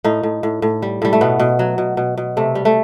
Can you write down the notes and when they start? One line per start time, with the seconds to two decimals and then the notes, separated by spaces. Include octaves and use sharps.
0.04 A2 D#4
0.23 A2
0.43 A2
0.62 A2
0.82 G3
1.02 A2 G3
1.13 A3
1.21 B2 B3
1.40 B2
1.59 F#3
1.78 B2
1.97 B2
2.17 B2
2.37 C3 A3
2.55 G3
2.65 A3